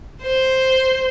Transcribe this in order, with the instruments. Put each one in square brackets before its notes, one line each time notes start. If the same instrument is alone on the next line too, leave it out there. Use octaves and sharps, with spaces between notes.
[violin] C5